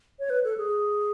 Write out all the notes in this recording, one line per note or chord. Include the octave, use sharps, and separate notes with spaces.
C#5
B4
A4
G#4